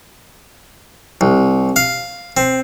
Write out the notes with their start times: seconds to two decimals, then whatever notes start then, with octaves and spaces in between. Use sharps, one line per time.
1.21 C2
1.76 F5
2.37 C4